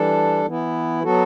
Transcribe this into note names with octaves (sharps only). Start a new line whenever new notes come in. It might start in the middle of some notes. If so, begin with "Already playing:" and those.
Already playing: E3 G3 D4 A4
E3 B3 E4
F#3 B3 F#4 A4